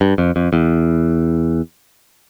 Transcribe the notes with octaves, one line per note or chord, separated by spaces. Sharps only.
G2
F2
F2
E2